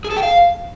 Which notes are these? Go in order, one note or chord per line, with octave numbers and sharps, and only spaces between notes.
G#4
A4
G5
F5